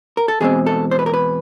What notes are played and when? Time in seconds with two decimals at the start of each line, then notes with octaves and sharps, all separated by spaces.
0.17 A#4
0.28 A4
0.40 E2 B2 G#3 C4 G#4
0.66 A4
0.91 C5
0.99 B4
1.06 A#4
1.14 B4